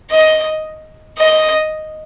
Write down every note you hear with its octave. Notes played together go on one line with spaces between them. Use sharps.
D#5
D#5